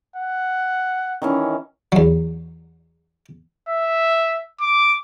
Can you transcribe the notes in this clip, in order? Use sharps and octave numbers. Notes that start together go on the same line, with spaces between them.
F#5
D#3 E3 C#4
E2 F#3
E5
D6